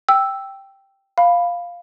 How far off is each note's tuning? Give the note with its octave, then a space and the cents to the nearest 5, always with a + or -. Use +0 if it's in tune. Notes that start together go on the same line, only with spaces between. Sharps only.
G5 +0 E6 +0
F5 +0 B5 +0